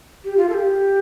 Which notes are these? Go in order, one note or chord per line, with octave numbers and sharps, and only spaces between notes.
G4
F4
A4
G4